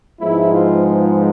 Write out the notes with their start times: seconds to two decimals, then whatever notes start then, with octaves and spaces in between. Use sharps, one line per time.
0.19 G#2 F3 G#3 B3 E4
0.52 F4
0.86 F4